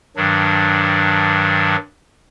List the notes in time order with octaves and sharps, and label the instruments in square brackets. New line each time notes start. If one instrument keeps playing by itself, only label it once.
[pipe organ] G2 D#3 F#3 D4